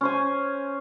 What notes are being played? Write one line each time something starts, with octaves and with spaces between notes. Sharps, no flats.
C#4 C5 G#5